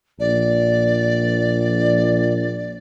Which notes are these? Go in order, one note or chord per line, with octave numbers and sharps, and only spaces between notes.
A#1 D5